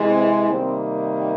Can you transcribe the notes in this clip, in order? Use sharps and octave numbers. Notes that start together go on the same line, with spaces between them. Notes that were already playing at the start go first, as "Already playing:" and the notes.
Already playing: C3 E3 G#3
C4
C3 D#3 G3 A#3 C4